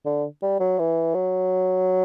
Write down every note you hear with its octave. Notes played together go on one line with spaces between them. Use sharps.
D3
G3
F#3
E3
F#3